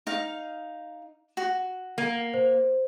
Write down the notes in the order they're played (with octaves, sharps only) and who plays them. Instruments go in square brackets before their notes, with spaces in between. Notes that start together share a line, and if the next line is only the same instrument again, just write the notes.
[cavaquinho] D#4 F5
F#4
[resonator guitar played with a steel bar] A#3
[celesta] C5